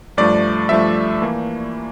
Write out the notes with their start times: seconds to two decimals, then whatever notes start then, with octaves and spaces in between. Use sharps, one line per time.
0.17 G2 F3 A3 D5
0.69 G2 F3 A3 E5
1.22 E3 A#3